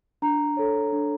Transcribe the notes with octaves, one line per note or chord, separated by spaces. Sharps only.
D4 A#5
A4 C#5
D4